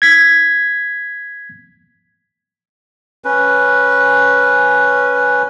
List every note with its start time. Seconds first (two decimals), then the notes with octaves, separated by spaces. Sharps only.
0.02 G#6 B6
3.24 C#4 B4